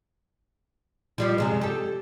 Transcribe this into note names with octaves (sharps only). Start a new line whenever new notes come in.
F3 G3 G4
F#2 C3 G#3
G4 A4